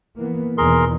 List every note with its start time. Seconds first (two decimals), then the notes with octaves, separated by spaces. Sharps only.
0.17 E3 A#3 B3
0.58 E2 B2 D#3 G#4 A#4 C6